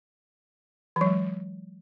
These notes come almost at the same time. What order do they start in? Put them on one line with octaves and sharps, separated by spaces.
E3 F#3 G#3